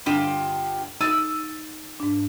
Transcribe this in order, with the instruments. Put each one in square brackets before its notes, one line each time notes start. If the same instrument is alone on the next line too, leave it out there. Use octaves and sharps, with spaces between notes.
[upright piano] G2 D3 E7 [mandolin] F4 G4 D#5 [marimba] B5
[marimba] D#4 [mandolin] E6 [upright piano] A6 D#7
[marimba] G#2 D4